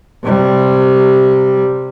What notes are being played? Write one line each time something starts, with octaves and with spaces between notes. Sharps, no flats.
C3 G3